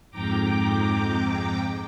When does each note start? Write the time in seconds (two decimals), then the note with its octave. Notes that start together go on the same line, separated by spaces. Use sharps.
0.11 F2 G#2 G5 A#5 D6